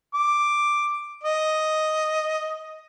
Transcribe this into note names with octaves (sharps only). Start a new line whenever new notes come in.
D6
D#5